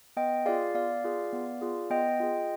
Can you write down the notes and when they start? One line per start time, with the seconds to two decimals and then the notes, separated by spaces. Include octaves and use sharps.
0.17 B3 D#5 G5
0.46 F4 G#4 D5 F5
0.74 B3 D5 F5
1.04 F4 G#4
1.32 B3
1.61 F4 G#4
1.90 B3 D#5 G5
2.20 F4 G#4